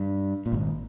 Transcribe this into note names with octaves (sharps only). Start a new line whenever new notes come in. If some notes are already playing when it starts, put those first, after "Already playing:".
Already playing: G2
A#2
G#1 G#2